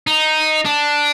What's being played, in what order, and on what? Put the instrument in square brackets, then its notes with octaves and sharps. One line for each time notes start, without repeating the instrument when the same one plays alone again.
[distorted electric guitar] D#4
D4